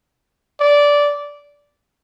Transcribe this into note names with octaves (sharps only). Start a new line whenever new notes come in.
D5